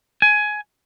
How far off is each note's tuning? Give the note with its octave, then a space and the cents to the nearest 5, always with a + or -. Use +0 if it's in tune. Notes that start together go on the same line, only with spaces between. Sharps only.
G#5 +15